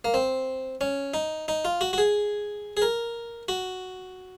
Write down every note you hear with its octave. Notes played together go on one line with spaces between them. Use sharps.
A#3
C4
C#4
D#4
D#4
F4
F#4
F#4
G#4
G#4
A#4
F#4